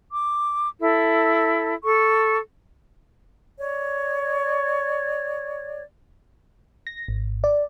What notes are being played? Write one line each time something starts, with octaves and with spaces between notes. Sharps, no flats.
D6
E4 A4
A4 C#6
C#5 D5
A#6
G#1
D5